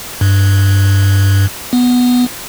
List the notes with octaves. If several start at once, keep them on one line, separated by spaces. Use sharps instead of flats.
G2
B3